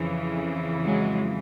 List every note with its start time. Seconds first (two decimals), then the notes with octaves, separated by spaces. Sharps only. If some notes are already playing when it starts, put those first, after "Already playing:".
Already playing: F2 C#3 E3
0.84 F#3 G#3